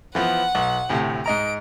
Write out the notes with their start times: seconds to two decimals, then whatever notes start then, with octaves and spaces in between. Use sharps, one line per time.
0.15 E3 F3 B3 F#5
0.55 B1
0.89 D2 A2 C3
1.26 G#2 D#5 A#5 D7